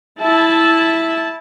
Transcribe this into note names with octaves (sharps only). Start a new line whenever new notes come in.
E4 A5